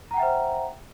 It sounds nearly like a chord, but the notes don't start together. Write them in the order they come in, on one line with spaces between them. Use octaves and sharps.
A#5 F#5 G5 E5 C5